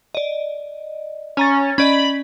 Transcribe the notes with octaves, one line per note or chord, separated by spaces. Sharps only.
D5 D#5
C#4 G#5 A#5 A6
C#4 D5 D#5 B5